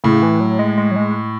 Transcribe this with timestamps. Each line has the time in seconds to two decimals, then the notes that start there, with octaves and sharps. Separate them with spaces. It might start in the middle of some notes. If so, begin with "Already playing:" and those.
0.04 A2 C#3
0.23 E3
0.40 F#3
0.59 G#3
0.78 G#3
0.91 F#3
0.96 G#3